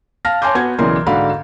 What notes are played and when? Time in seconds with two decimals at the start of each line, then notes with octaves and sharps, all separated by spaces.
0.25 F5 A5 F6 A#6
0.42 C#5 G#5 A5 C6 D6 G6
0.55 B3 F#4 G#6
0.79 B1 C#3 E3 A#4 D5 C6
1.06 G#2 D3 F#4 D5 F5 B5